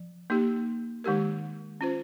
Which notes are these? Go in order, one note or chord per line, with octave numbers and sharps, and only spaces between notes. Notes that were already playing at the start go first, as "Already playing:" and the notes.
Already playing: F3
A#3 D#4 G4
D#3 G#3 D#4 G4 A#4
C#4 F4 C5